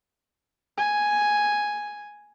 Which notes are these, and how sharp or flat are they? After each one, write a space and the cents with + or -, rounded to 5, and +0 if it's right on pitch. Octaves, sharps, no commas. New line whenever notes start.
G#5 +0